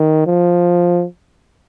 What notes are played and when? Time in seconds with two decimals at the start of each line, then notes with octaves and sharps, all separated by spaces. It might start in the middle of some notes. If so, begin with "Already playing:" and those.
Already playing: D#3
0.27 F3